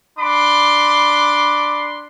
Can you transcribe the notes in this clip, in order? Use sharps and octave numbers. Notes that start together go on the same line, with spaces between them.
D4 B5 C6 D6